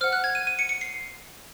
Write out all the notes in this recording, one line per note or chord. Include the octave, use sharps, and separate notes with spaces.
C5 F#5 F6
F#6
G#6
D#7
D#7
C#7
C#7
C7